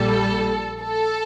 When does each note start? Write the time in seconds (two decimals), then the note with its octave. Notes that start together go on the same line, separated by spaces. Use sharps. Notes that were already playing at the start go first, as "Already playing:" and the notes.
Already playing: A#1 A#2 G3 A4
0.80 A4